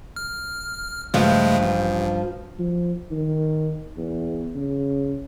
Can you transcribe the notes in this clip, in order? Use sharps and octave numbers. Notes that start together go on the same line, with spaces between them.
F6
G2 C#3 F3 G#3 A3
A1
F3
D#3
E2
C#3